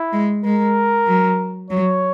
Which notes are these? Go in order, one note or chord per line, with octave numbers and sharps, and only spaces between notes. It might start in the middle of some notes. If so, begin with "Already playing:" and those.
Already playing: E4
G#3
G#3 A#4
F#3
F#3 C#5